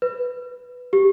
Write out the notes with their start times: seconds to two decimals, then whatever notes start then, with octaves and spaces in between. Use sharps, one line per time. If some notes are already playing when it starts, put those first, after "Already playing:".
0.02 B4
0.93 G4